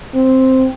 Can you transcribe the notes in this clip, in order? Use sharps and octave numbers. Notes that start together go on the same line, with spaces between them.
C4